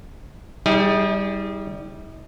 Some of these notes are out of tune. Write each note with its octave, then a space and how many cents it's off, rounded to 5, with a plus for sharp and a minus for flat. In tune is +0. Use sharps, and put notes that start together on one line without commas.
G3 +0 E4 -45 G#4 -25